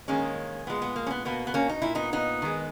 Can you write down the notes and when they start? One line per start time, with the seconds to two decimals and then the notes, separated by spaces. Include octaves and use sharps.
0.08 D#3 G#3 A#3 C#4
0.67 A#2 G#3 B3
0.82 B3
0.96 A#3
1.07 C#4
1.10 B3
1.25 B2 A#3 B3
1.47 B3
1.54 A#3 C#4
1.69 D#4
1.82 A#2 A#3 E4
1.95 B3 D#4
2.13 B3 D#4
2.42 D#3 G#3